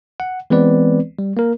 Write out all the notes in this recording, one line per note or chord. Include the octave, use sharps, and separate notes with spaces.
F#5
E3 G#3 B3 C4 B4 D5
G3
A#3 A#4